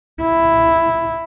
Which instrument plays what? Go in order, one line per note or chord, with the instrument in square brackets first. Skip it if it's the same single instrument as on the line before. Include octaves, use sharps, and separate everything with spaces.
[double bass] E4